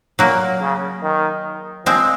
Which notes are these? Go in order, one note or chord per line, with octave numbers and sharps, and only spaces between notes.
A#2 F#3 A#3
C#3
D#3
F3 G#3 C4